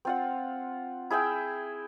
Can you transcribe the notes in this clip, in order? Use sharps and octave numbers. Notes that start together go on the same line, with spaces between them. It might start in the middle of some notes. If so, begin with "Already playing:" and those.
C4 F4 F#5
E4 G#4 E5 G5